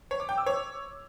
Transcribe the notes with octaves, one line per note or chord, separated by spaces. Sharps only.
C#5
D6
G5
E6
C#5